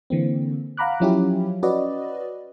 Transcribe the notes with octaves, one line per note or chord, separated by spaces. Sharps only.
D3 E3 A#3 C4
F5 F#5 A#5 B5 D6 F#6
F3 F#3 C#4 E4 F4 G4
C#4 F#4 B4 D5 D#5